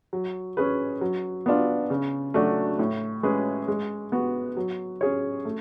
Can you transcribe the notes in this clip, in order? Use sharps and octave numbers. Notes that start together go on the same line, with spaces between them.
F#3
C#4 G#4 B4
F#3
B3 D4 F4
C#3
F#3 A3 D4 F#4
A2
G#3 C#4 G#4 B4
G#3
B3 F#4
F#3
C#4 G#4 C#5
A3